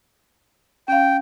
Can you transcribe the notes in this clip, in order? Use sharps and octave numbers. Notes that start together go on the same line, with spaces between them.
C#4 F5 G5